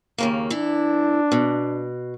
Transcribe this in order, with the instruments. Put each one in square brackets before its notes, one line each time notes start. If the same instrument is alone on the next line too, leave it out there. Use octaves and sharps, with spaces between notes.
[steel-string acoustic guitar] D#2 C#3 A#3
[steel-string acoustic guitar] E3 E4 [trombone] D4
[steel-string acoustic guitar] B2